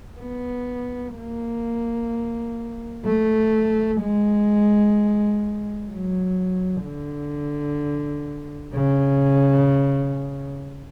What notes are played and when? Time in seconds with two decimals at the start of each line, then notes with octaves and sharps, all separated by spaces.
0.20 B3
1.16 A#3
3.05 A3
4.01 G#3
5.90 F#3
6.85 D3
8.74 C#3